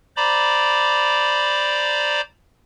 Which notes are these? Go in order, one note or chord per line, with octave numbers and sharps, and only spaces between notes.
C5 D5 A#5 B5 D6